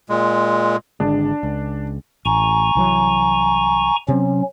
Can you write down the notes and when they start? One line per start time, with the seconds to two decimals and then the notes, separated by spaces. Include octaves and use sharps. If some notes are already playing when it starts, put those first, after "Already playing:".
0.09 A#2 G#3
1.00 G#1 D3 G#3 D4
1.43 C#2
2.25 A1 G#5 A#5 C#6
2.75 C2 E3 F#3
4.08 C3 F#3 C4 C#4